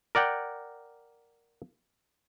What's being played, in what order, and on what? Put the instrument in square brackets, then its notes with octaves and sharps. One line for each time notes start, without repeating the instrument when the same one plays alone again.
[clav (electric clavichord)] A#4 D5 F#5 G5